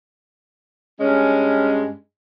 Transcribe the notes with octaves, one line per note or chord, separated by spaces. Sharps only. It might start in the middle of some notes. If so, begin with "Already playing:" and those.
G2 G#3 C#4